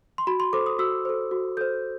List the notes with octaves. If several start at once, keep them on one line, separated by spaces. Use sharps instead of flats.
C6
F#4 B5
C6
A4 C5 D6
D#6
F#4 E6
A4 C5
F#4
A4 C5 G6